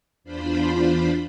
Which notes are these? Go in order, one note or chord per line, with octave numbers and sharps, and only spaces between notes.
E2 D4 F4 C5 B5